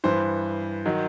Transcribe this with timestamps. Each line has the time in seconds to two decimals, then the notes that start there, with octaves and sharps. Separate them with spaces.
0.04 G2 E3 C5
0.85 D#3 F#3